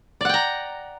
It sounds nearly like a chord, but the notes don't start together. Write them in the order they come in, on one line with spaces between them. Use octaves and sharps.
D5 F#5 G5 A#5